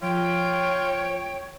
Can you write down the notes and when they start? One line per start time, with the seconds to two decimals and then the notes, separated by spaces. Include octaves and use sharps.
0.02 F3 F4 C#5 G5